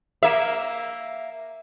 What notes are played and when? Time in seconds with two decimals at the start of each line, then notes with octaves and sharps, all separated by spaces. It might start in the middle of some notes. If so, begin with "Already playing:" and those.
0.23 A#3 E5